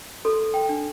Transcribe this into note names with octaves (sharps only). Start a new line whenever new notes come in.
A4 C6
G5
D4